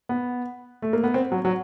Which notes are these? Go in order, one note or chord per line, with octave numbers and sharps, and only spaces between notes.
B3
A3
A#3
B3
C4
F#3
F#3